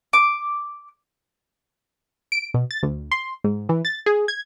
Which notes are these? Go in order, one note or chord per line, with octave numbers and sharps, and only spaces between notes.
D6
D7
B2
A6
D2
C6
G#2
E3
A6
G#4
G#6